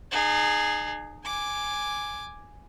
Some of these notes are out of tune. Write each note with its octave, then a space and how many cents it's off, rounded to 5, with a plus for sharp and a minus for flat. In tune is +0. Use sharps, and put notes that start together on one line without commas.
D#4 -40 G#4 +0
G#5 +0 D6 +0